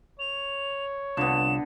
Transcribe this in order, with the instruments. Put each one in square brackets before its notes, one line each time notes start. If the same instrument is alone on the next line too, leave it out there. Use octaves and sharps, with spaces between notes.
[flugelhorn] C#5 [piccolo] F7
[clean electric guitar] C2 F4 [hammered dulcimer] D3 B3 [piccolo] E7